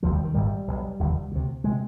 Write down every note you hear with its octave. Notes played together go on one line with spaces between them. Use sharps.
F1 D#2 D3 F3
G3
D#3
G#1 G#2 G3
B1 B2
F1 D#2 D3
D2 C3
C3 G#3